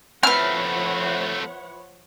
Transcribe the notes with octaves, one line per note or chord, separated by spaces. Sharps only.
F3 A3 C4 E4 B4 C#5 F#5 F6